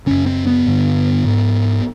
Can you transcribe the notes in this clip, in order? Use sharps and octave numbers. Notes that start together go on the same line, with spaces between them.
F#2 C#3 C#4
C4
B3
G2 D3
G#2